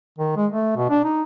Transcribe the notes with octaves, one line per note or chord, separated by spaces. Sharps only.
D#3
G#3
A3
B2
D4
D#4